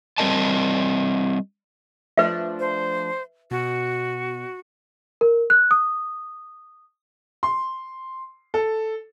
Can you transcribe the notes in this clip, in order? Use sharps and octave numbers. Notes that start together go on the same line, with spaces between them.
G3 C4 C#4 A#4 D#5 A5
F3 A3 D4 B4 E5
C5
B2 F#4
A#4
F#6
D#6
C6
A4